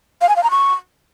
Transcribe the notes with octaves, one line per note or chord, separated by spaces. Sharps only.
F5
G#5
F5
A#5
C#6